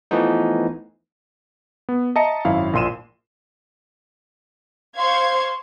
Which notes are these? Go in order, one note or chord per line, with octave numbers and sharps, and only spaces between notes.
E3 F3 A3 B3 D#4
B3
D#5 E5 A5 A#5 C#7
G#1 F#2 E4 F5
A#1 A#2 C6 D#7 E7
C5 F5 C6 C#6 G#6